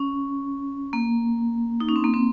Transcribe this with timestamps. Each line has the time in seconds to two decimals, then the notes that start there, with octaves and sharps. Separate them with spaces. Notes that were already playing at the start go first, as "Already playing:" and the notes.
Already playing: C#4
0.93 A#3
1.80 D#4
1.89 C#4
1.96 C4
2.04 A#3
2.14 C4